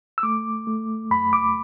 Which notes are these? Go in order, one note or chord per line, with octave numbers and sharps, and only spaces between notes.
E6
A3 D6
A3
F#2 B5
D6